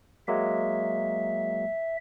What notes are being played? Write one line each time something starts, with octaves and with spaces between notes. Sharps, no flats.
F#3 G#3 A#3 E5